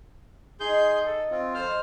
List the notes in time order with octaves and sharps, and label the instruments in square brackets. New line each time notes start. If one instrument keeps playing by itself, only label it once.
[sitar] D#4 [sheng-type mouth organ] G#4 C6 G6
[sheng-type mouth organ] A4
C4 F4
[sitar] F2 A4 [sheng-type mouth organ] C5 F6